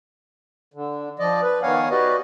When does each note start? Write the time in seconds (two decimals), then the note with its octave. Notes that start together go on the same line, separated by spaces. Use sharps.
0.74 D3
1.19 F3 D5 D#5
1.42 B4
1.62 D#3 B3 C#5 F5 F#5 G#5
1.91 F#4 G4 B4 D5 D#5